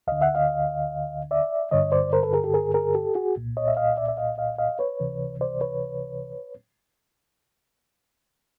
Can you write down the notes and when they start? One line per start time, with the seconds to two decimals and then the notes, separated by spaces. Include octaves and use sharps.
0.07 D2 D3 D#5 F5
0.22 E5 F#5
0.35 D#5 F5
1.31 D5 E5
1.71 G2 D3 C#5 D#5
1.92 C5 D5
2.13 A#4 C5
2.23 A4 B4
2.33 G#4 A#4
2.44 G4 A4
2.54 G#4 A#4
2.74 G#4 A#4
2.95 G4 A4
3.15 F#4 G#4
3.36 C2 A#2
3.57 C#5 D#5
3.68 E5
3.77 D#5 F5
3.97 D5 E5
4.08 E5
4.17 D#5 F5
4.38 D#5 F5
4.58 D#5 F5
4.79 B4 C#5
5.00 C#2 C3 E3
5.41 C5 D5
5.61 B4 C#5